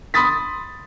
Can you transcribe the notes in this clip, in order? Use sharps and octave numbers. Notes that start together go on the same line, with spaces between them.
B5 C6 D#6 A6 B6